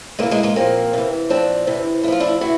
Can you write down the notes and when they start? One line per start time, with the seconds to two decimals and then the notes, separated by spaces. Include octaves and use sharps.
0.19 C3 G#3 A#3
0.23 E3
0.31 G#3 A#3
0.43 G#3 A#3
0.56 A#2 F3 A#3 C4
0.93 C3 E3
1.30 A#2 F3 C4 D4
1.67 C3 E3
2.03 A2 E4
2.08 F3 F4
2.20 D4 E4
2.41 C3 E3 E4 F#4